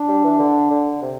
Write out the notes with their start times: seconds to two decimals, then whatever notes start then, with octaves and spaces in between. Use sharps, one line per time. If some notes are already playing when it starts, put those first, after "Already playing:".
Already playing: D4
0.09 G3
0.24 E3
0.39 D3
0.71 D3
1.02 C3